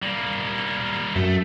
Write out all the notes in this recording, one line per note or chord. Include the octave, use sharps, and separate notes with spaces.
G3 A#3
F#2 A3